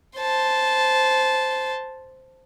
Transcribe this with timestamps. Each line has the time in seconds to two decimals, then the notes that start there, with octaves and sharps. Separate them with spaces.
0.18 C5 A5